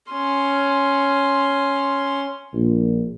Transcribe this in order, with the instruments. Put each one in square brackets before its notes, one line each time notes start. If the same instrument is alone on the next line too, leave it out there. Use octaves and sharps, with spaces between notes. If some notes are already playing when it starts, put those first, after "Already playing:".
[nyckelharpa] C#4 C6
[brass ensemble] A#1